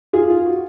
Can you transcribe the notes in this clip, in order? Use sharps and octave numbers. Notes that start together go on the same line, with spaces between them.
F4 G#4
F4
F#4